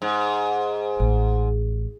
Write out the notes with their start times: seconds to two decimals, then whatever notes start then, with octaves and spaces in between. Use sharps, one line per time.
0.02 G#2
1.00 A1